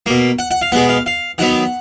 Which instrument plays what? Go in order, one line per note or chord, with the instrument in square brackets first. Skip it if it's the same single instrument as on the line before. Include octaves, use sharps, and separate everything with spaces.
[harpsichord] B2 A#3
F#5
F#5
F5
B2 G#3 B3 F#5
F5
F5
D#3 F#3 B3 F#5